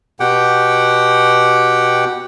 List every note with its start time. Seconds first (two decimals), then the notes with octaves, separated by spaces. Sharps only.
0.20 B2 G4 F#5 G5